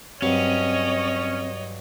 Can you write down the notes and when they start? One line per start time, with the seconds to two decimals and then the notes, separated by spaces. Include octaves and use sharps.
0.22 G2 F#3 C4 C#4 C#5 D#5